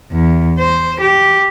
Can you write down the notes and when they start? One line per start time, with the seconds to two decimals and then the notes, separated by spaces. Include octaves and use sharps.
0.11 E2
0.59 C5
1.01 G4